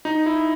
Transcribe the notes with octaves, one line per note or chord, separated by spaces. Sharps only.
D#4
E4